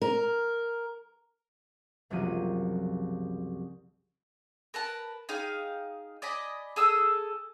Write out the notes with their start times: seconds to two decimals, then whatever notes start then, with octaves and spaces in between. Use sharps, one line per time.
0.02 A#4
2.10 F#1 C2 F3 F#3 A#3 D#7
4.74 A#4 B4 A5
5.29 D#4 G#4 F5 G5
6.22 D5 D#5 G#5 B5
6.76 G#4 A4 D#6 E6